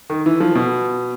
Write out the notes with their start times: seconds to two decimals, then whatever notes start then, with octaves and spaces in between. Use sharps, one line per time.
0.10 D#3
0.26 E3
0.40 F3
0.55 B2